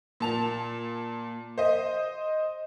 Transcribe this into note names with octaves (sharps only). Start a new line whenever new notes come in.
A#2 A5 F7
C5 D#5